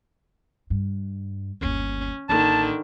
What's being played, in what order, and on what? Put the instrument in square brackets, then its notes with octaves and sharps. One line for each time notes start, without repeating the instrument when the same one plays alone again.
[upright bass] G2
[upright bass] G1 D#2 [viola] C#4
[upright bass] A1 A#3 [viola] D3 D#3 [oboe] A5